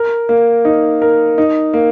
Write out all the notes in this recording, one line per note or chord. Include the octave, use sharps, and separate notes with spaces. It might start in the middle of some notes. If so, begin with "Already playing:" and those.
Already playing: A#4
A#3
D#4
A#4
D#4
A#3